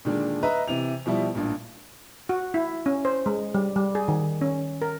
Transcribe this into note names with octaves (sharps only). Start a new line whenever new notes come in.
A#2 D3 D#3 G#3 D4
B4 D#5 E5 A#5
C3 E3 F7
B2 F3 G3 E4
A1 G2 A#2
F#4
E4
C#4
C5
G#3
G3
G3
G#4
D#3
C#4
A#4